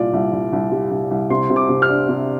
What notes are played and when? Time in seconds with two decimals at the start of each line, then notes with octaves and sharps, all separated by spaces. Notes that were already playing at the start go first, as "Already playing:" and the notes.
Already playing: C2 A#2 D5
0.13 C2
0.33 C2
0.52 C2
0.72 G3
0.91 C2
1.11 C2
1.30 C3 C6
1.50 C3
1.56 D6
1.69 C3
1.82 F6
1.89 D4
2.09 C3